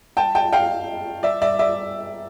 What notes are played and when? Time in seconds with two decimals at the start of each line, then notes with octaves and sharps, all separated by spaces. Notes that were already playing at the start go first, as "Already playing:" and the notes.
0.17 G5 A5
0.35 G5 A5
0.52 F5 G5
1.23 D5 E5
1.42 D5 E5
1.59 D5 E5